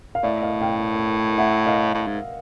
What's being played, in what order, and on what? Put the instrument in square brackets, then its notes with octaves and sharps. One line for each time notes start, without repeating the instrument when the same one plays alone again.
[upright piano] F5
[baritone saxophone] A2 [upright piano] D5 E5
[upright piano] D#5 F5
F5 G5
E5 F#5
D#5 F5
[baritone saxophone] A2
G#2